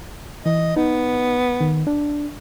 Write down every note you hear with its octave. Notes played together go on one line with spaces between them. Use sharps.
E3 D#5
B3 D#4
D#3
D4